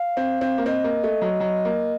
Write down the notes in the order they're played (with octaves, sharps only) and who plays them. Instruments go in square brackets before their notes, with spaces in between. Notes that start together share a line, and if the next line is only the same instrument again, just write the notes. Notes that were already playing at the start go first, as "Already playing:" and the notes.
Already playing: [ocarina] F5
[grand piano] C4
C4
A#3
[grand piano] C4 [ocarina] D#5
[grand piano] A#3
A3
F#3
F#3
A#3